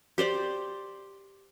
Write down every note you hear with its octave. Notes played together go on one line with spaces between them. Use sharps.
G4 C5 D5 G5